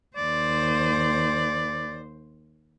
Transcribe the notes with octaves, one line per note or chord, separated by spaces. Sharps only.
D#2 C5 D5